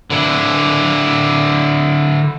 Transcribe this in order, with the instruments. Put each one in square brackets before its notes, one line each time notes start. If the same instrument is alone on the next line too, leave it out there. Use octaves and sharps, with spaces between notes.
[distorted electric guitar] D3 E4